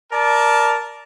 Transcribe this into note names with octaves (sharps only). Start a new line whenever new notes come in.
A#4 D5 A5